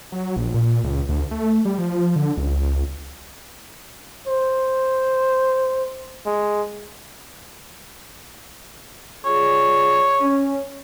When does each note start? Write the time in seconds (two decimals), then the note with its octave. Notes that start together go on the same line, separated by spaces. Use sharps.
0.12 F#3
0.36 A#1
0.54 A#2
0.84 C#2
1.09 D2
1.31 A3
1.65 G3
1.78 F3
2.16 D3
2.37 C#2
4.27 C5
6.26 G#3
9.25 G3 F4 G#4 C#5
10.21 C#4